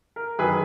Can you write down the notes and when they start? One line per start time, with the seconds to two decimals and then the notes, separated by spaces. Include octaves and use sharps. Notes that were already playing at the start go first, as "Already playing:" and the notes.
0.16 A#4
0.38 F#2 D#3 F#3 G#4 B4